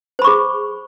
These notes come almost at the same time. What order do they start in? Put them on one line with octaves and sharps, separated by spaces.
C5 B5 C#6 G#4